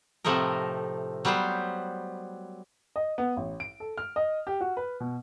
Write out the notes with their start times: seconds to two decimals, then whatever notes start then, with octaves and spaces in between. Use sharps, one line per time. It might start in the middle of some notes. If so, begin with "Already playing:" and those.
0.24 A2 C3 F3 A3 D#4 A#4
1.25 F#3 G3 B3 G4 C5
2.96 D#5
3.18 B3
3.37 A1
3.60 D7
3.80 A4
3.98 F6
4.16 D#5
4.47 G4
4.61 F#4
4.77 B4
5.00 B2